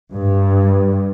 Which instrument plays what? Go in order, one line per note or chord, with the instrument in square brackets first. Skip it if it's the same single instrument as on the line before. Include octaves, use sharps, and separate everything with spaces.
[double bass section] G2